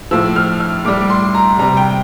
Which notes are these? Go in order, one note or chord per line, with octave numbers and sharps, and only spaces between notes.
A2 F3 E6
F6
F6
A2 G3 D6
C6
A#5
C3 G3 A#5
G5